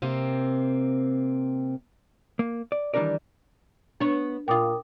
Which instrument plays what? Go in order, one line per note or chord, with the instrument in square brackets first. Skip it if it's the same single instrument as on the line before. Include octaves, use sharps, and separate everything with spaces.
[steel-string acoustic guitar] C3 A#3 C4
[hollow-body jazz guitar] A#3
D5
D#3 E3 G3 D4 A#4 D5
[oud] B3 C#5 [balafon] D4
[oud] A#2 F4 [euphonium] A#4 [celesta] G5 D6 D#6